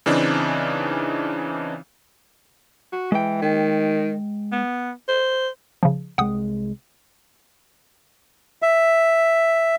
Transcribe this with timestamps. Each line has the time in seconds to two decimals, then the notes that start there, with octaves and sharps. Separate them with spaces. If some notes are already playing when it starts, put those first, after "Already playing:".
0.06 C#3 E3 C4 D4 D#4
2.92 F#4
3.12 E3 G#3 G5
3.42 D#3
4.52 B3
5.08 C5
5.83 C#3 F3
6.18 C2 G#3 F#5 G5 D#6
8.62 E5